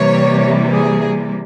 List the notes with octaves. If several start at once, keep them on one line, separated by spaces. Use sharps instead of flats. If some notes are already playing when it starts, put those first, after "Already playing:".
Already playing: C3 E3 G3 A#3 C#5
G#4